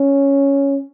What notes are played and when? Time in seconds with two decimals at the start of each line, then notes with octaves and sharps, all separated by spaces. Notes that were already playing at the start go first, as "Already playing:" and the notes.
Already playing: C#4